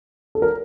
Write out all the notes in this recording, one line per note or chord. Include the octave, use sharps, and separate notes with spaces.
A4
A#4